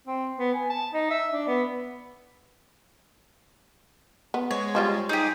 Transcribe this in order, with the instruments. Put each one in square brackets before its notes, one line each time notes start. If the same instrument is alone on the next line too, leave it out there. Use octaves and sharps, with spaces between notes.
[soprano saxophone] C4
B3
G#5
A5
D#4
E5
D4
B3
[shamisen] B3
[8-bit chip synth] G#3 [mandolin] C#5
[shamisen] F3 G3 F4
[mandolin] D#4 G4 [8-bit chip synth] G#4 D#6